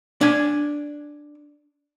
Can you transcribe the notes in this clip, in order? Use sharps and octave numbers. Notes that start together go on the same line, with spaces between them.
D4 G#5